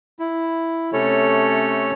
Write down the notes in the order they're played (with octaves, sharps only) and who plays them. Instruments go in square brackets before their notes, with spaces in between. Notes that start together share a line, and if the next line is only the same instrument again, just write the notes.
[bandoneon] E4
C3 A3 C#4 A4 C#5